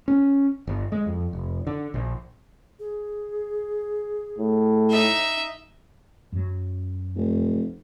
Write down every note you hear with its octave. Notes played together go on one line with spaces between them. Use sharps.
C#4
G1
G#3
F2
F1
D3
A#1
G#4
A2
D#4 E5
F#2 F#3
F1